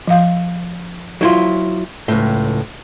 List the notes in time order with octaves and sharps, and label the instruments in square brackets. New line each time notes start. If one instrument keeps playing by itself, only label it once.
[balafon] F3 F5
[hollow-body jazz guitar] F#3 E4 F4
C#2 A2